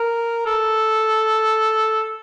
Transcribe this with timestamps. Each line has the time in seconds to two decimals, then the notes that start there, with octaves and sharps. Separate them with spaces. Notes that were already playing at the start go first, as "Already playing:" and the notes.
Already playing: A#4
0.46 A4